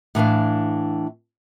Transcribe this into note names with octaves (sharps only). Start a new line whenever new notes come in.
A2 E3 D4 F5